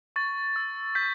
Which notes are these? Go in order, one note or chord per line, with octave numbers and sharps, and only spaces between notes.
C#6 A6
E6
G6 B6